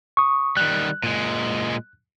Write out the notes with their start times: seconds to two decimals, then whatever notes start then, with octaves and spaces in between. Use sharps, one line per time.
0.17 C#6 D#6
0.57 D#3 G3 F#6
1.03 A#2 G#3